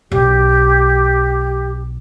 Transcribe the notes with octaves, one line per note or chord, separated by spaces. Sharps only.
B1 G4